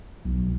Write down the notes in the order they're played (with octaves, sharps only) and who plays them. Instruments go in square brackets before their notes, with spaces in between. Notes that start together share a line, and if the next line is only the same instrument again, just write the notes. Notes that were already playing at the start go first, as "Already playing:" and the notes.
[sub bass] B1